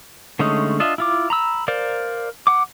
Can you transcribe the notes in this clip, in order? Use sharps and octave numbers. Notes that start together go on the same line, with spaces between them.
D3 G#3 A3 C#4 D#4
D4 F4 D#5 E5
E4 F4 D6
A#5 B5 E6
A#4 C5 D5 F5
F#5 D6